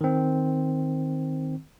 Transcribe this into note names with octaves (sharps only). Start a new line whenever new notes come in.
D#3 C4